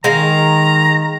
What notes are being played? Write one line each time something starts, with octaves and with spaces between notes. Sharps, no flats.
D#3 G#3 F5 A#5